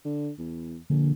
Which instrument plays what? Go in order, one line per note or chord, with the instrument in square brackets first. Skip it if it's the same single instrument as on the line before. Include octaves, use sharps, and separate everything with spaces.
[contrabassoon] D3
E2
[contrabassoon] A#1 [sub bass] D3